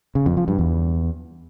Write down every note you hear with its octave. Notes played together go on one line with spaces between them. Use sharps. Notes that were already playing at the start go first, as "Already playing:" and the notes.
C#3
F2
F3
G2
E2